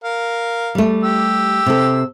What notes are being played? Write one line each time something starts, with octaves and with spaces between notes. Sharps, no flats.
A#4 F5
G3 A3
G4 E6
C3 A4